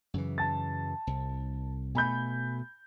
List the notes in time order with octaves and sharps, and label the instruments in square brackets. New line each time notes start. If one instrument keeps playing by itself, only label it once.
[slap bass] F#2 C#3 E3
[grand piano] A5 A6
[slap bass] C2
[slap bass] B2 A3 [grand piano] G#5 B5 G6